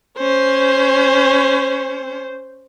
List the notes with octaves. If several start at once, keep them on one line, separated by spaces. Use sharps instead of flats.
C#4 C5